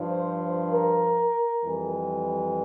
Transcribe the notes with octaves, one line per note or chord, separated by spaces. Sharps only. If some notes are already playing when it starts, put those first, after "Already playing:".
Already playing: G2 F3
C5
C5
A#4
F2 E3 G3